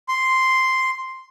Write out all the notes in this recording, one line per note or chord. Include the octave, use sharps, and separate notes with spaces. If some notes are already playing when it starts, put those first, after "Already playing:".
C6